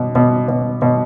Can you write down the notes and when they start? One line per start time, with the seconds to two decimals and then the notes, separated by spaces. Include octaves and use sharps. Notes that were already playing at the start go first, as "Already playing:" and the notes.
Already playing: B2
0.15 B2
0.48 B2
0.82 B2